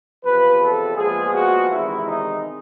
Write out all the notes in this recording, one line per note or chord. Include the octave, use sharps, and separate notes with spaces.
E2 C3 F3 B4
A4
A#2 F3 G#3 B3 G#4
F#4
E2 C3 D#3 G#3 C4 E4
D#4